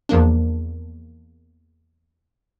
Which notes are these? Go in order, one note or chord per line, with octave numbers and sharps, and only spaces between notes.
E2 F3 A#3 D4